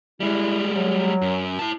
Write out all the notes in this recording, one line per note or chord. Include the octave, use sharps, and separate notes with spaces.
G3 G#3 E4
F#3
F#2
E4 A5